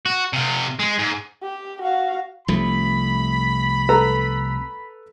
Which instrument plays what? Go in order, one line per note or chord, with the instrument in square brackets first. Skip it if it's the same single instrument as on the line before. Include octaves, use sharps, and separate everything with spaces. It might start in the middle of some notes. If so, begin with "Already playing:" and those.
[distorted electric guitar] F#4
C3 F4
G#3
G#2
[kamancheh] G4
F#4 F5
[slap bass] C2 F3 A3 [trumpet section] B5
[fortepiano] A4 B4 A#5